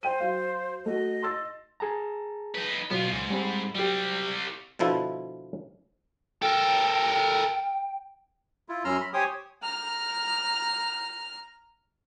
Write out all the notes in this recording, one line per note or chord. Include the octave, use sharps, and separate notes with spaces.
C5 G5 D#7
F#3 F5
A3 F#4 D#5
C6 E6 A6
G#4 A5 A#5
D#4 B4
B2 F#3 B3 F4
C#2 G#2
G3 C4 B5
F#3 G3 C4 G4
B2 D3 F3 E4
A4 A#4 G5
E4 F4
F#2 C#4 A#5 C6 E6 F6
B5
G4 C5 C#5 G5 G#5 D#6
A#5 F6